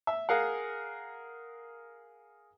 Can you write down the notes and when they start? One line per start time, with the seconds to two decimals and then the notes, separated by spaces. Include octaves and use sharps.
0.07 E5
0.29 G#4 A#4 F5 F#5